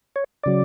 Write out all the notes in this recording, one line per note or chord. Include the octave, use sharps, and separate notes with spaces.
C#5
C#3 F#3 D5